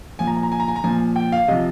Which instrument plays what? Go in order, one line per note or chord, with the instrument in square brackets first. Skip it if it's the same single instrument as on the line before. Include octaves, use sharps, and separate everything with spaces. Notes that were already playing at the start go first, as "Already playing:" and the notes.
[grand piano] A#2 F3 G#5
A#5
G#5
A#5
G#5
A#5
G#5
A#5
A#2 F3 G#5
G5
F5
C3 D#5
F3